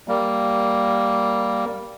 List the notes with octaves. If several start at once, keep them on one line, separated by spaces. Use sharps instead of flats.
G3 A#3